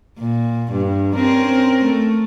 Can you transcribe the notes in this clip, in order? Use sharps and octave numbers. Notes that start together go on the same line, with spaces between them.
A#2
G2
C4 C#4 A#4
A3